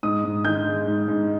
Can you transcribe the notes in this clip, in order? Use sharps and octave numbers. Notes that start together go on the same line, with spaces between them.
G#2 D#6
G#2
D#3 G6
G#3
G#2
G#2